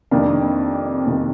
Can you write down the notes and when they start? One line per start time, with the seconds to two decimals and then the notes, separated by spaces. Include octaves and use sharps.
0.11 F2 C3 D#3 A#3 D4
1.06 F2 C3 D#3 A#3